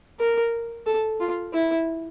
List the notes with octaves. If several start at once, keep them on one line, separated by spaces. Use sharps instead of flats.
A#4
A4
F4
E4